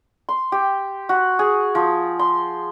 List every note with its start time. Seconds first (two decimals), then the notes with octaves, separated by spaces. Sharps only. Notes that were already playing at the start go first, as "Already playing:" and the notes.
0.29 C6
0.52 G4
1.09 F#4
1.39 G#4
1.75 F3
2.19 C6